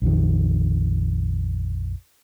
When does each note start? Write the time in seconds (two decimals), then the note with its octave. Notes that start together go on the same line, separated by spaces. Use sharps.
0.02 A#1 F2 D#3